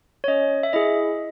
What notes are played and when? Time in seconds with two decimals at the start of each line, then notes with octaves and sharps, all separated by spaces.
0.24 C#5
0.28 C#4 D#5
0.63 E5
0.73 E4 G#4 D#5